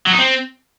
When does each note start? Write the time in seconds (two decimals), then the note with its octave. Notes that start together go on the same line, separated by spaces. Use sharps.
0.07 F#3
0.13 D#4
0.19 C4